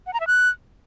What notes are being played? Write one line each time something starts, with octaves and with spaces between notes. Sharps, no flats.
F#5
A#5
E5
F#6